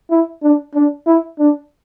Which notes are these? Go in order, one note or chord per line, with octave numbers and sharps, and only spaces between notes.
E4
D4
D4
E4
D4